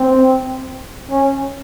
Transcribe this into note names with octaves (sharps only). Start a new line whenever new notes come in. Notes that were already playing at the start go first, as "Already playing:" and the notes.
Already playing: C4
C#4